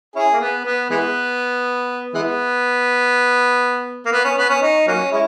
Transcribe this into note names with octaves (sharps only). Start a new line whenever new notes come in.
C#4 E4 G#4
A#3
B3
B3
E3 G#3 B3
E3 G#3 B3
A#3
B3
C#4
B3
C#4
D#4
F#3 A#3 C#4
G#3 C#4 E4